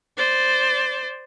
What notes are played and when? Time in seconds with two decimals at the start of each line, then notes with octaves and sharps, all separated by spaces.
0.17 C5 D5